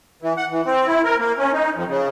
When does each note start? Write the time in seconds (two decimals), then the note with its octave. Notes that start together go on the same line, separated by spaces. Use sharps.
0.22 E3
0.37 F#5
0.51 E3
0.66 C4
0.87 E4
1.04 A#4
1.19 A#3
1.38 C#4
1.53 D#4
1.74 F2
1.88 C#3